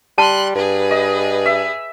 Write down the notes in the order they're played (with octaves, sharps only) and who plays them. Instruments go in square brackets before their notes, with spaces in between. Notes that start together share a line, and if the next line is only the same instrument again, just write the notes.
[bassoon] G3 [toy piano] A5 [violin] C6 F#6
[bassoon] G2 [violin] G#4 B4
[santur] D#5
E5